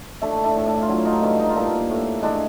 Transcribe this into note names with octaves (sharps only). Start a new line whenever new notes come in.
A3 D4 E4
D4 E4
A2
D4 E4
F4
F#3 D4 E4
D#4 F4
G2 D4 E4
D#4
F4
A#3 D4 E4
A2
G#3 D4 E4